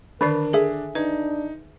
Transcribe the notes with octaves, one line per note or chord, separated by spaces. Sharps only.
D3 D#3 D4 A#4 B4 D5
G#4 A4 E5
D4 D#4 B4